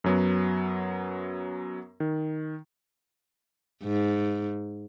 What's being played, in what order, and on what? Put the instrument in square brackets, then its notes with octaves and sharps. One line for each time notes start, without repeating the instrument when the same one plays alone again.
[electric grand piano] F#2 F#3 B3
D#3
[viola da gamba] G#2